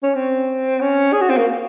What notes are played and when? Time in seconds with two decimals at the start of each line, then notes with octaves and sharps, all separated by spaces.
0.03 C#4
0.15 C4
0.81 C#4
1.13 G#4
1.21 F#4
1.30 C4
1.37 A#3